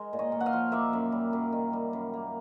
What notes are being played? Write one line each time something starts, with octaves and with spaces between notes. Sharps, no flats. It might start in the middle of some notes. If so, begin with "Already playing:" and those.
Already playing: G#3 A#4
A#2
C#5 D#5
A#2
F#5
D#5 F5
F3
A#3 D5 E5
F#2
G3
F#2
D#3
G3
F#2
A#3